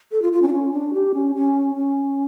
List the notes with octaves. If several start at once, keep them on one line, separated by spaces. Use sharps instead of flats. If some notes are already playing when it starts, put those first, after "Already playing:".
A4
F4
F4
C#4
D4
C#4
D4
G4
C#4
C#4
C#4